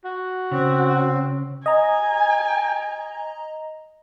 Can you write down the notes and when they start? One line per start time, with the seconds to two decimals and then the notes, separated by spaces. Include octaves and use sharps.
0.05 F#4
0.51 C#3 C4
1.66 D#5 G#5 A#5